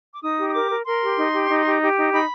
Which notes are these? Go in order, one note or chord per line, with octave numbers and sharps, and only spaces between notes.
D6
D#4 D#6
G4
D#6
A#4 D6
A#4
A#4 C6
G4
D#4
G4
D#4
G4
G4
D#4
D#4 B5